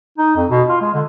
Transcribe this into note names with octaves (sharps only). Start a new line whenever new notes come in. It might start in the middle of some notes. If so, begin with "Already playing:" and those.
D#4
F2
B2
F4
G#3
D3